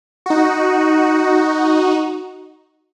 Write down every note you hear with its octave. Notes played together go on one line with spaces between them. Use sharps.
D#4 F#4